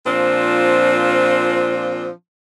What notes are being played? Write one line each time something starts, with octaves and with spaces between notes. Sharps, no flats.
A#2 F3 C4 D4 F4